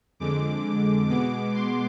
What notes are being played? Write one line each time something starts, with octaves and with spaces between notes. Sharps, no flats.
F2 D3 G#3 D6
B2 G#3 B3 D6
C6